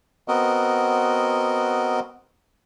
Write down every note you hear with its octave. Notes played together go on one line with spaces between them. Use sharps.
B3 C4 F#4 A#4 D#5